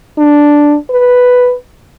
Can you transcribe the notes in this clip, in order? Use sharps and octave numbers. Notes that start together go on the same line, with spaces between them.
D4
B4